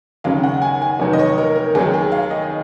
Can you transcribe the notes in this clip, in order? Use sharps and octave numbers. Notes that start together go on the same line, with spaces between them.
D#2 C#3 F#3 F5
F#5
G#5
G#5
F1 D#2 D#3 F#3
D#5
C#5
A#4
A#4
D#2 D#3 F#3 G#4
G#4
F5
D#5